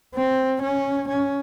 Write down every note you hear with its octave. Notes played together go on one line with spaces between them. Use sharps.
C4
C#4
C#4